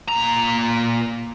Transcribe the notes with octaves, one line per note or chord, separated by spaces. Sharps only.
A#2 A#5